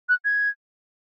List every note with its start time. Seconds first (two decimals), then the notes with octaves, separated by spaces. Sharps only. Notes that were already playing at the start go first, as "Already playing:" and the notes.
0.09 F#6
0.25 G#6